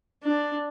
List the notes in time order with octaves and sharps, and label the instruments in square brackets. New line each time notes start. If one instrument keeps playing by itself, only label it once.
[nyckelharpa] D4